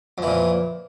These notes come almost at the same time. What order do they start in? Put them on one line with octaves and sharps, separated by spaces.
F2 E3 A#2